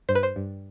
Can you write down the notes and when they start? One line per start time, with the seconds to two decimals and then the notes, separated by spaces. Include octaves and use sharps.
0.09 G2 C5
0.15 B4
0.23 C5
0.36 G2